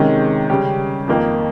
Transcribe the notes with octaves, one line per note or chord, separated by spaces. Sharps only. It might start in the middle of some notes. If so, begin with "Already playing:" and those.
Already playing: C3 D#3 G#3 C#4
C#3 G3 C#4 G4
F2 D#3 A#3 D#4